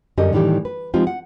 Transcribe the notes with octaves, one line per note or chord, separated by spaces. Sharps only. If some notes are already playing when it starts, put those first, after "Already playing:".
F#2 D3 G3 C#4 G4 D#5
A2 D#3 E3 G3 G4
B4
F3 G#3 C4 D#4 F4 G4
F#5